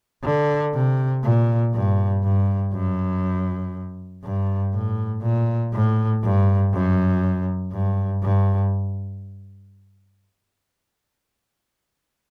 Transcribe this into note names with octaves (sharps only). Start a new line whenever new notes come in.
D3
C3
A#2
G2
G2
F#2
G2
A2
A#2
A2
G2
F#2
G2
G2